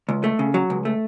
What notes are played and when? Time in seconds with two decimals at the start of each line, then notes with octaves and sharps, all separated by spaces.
0.09 C#2
0.24 A3
0.39 C#3
0.54 F#3
0.70 C#2
0.85 A3